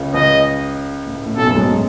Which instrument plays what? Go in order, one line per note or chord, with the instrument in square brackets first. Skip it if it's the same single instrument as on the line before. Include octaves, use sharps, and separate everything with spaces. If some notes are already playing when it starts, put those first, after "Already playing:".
Already playing: [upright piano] C#2 C#3
[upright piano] C#2 C#3 [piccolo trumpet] D#5
[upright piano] A2
A2
A2
[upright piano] B1 B2 [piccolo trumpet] A4
[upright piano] F#2 F#3
G#2 G#3
F#3